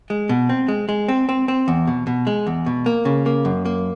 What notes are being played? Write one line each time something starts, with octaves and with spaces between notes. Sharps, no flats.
G#3
B2
C4
G#3
G#3
C4
C4
C4
E2
B2
B2
G#3
E2
B2
A#3
C#3
A#3
F#2
A#3